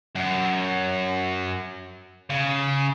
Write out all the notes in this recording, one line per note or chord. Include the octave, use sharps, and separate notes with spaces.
F#2
C#3